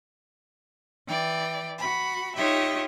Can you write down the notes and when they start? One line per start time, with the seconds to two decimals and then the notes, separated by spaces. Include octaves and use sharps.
1.07 E3 D5 G5
1.79 F#4 B5
2.36 D#4 F4 G4 C#5 D#5 E5